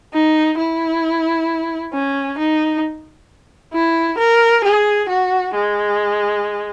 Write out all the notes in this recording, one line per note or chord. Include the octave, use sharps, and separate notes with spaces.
D#4
E4
C#4
D#4
E4
A#4
G#4
F#4
G#3